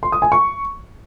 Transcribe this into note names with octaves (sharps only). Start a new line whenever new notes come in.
C6
D#6
G#5
C#6